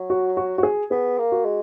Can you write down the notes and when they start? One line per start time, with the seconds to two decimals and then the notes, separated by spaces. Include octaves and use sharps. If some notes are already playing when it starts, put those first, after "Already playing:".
Already playing: F#3
0.10 F#4
0.37 F#4
0.58 F#4
0.63 G#4
0.91 B3 G#4
1.18 A#3
1.32 F#4
1.45 G#3